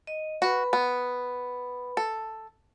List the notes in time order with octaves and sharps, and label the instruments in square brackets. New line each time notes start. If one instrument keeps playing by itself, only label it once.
[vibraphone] D#5
[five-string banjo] F#4 [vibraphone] B4 B5
[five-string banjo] B3
A4